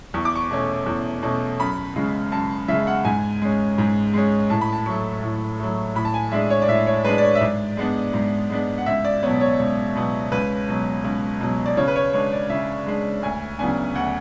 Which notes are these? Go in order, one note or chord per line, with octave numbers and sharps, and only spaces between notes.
E2 C#6
D6
C#6
B2 A3 C#4
E2
B2 A3 C#4
F#2 B5
C#3 G#3
F#2 A5
C#3 G#3 E5
F#5
G#2 G#5
G#3 C#4
G#2
G#3 C#4
A2 A5
B5
A5
F#3 A3 C#6
A2
F#3 A3
A2 B5
A5
G#5
G#3 D4 E5
C#5
D5
A2 E5
C#5
G#3 D4 B4
D5
C#5
E5
G#2 D5
G#3 B3 D4
G#2
G#3 B3 D4
F#5
C#2 E5
D5
B2 F#3 B3 C#5
C#5
C#2
B2 F#3 B3
C#2 B4
B2 F#3
C#2
B2 F#3
D5
C#3 C#5
B4
C#5
G#3 D4 C#5
D5
C#3 E5
G#3 D4
D2 G#5
C#3 F#3 B3 D4 G#5
D2 F#5